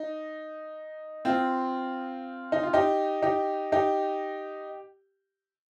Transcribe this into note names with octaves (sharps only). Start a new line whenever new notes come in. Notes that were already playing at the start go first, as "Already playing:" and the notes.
Already playing: D#4
C4 F4
D#4
F4
D#4 G4
D#4 G4
D#4 G4